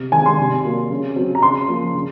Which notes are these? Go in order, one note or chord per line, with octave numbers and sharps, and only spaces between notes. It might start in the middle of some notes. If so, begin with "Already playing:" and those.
Already playing: C3
D#3 G#3 C4 G#5
C6
C3
F#3 A#3
C#3
F#3 C4
A#5
C#3 C6
F3 A#3
C#3